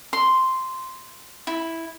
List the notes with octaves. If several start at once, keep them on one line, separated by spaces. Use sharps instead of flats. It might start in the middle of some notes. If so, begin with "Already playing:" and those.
C6
E4